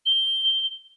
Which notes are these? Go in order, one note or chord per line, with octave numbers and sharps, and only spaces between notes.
G7